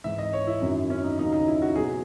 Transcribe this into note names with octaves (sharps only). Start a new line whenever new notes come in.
G#2 E3 E5
D#5
C#5
E4
F#2 D#3 F#3
C#4
D#4
D#2 C#3 F#3 D#4
D#4
E4
F#4
E2 B2 F#3 G#4